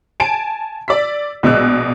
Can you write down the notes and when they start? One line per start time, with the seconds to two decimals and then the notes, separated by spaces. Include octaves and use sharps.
0.20 G#5 A5 D7
0.88 D5 E6 B6
1.43 A#1 B2 G#3 E6 F#6